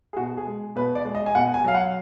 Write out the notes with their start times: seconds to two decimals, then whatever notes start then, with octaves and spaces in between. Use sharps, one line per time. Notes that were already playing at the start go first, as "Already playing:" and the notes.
0.13 G#4
0.17 B2 F#4
0.37 G#4
0.46 G#3
0.76 B2 B4
0.95 D5
1.05 G#3
1.15 D#5
1.26 G#5
1.35 B2 F#5
1.54 G#5
1.64 F#3 F5
1.75 F#5